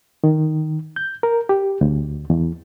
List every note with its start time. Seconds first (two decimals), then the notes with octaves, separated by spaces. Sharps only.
0.24 D#3
0.96 G6
1.23 A#4
1.49 G4
1.81 D2
2.30 E2